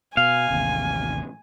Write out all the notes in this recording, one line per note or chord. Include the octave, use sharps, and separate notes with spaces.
B2 F5 G#5
A1 D#2 C3